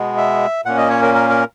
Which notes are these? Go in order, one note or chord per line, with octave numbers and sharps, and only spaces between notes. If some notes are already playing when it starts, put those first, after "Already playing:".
Already playing: B2 G#3 B3
E5
A#2 A#3 C#4 F#5
D#5
C#5
A#4
A#4
A#4